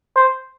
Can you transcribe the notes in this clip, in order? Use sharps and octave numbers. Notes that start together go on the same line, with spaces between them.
C5